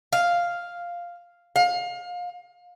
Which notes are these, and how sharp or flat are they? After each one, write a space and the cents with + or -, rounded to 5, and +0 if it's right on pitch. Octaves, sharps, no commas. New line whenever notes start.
F5 +0
F5 +30